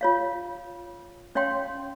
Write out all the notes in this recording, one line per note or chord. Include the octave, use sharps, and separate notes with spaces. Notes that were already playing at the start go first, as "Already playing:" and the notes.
F4 C#5 F5
C#4 C#5 F5 G5 C6